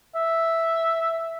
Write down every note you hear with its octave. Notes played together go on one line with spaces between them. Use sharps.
E5